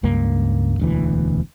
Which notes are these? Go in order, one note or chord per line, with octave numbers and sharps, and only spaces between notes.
C#2 G2 A#3
E1 D2 E3